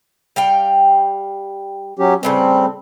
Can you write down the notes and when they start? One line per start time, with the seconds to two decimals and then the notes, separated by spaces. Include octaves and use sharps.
0.36 G3 F5 G5
1.99 F#3 C#4 G4
2.23 A2 C#3 G3 C4 B4